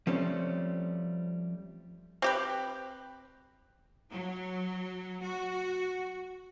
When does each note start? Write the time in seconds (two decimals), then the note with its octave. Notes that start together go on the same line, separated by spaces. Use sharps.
0.07 F3 G3 A3 C4 C#4
2.22 C4 G4 B4
4.09 F#3
5.22 F#4